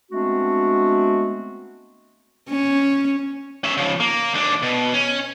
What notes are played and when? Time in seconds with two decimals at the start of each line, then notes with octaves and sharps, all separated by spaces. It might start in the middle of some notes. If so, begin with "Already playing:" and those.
0.11 G#3 A3 B3 C4 D4 F#4
2.49 C#4
3.64 C#4 E5
3.77 C#3 F3
4.00 A#3
4.33 D#2 D4
4.62 B2
4.94 C#4